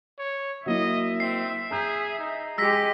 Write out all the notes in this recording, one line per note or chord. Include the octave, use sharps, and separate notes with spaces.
C#5
F#3 A#3 E4 D#5 E5
C4 C7
G#4 A#5 G6
D#4
G#3 G4 E6 A#6 B6